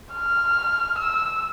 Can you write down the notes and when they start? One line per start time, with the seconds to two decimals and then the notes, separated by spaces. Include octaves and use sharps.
0.13 F6
0.98 E6